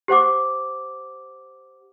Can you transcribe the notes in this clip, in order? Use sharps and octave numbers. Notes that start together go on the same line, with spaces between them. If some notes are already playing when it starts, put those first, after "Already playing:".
G4 C5 F#5 D6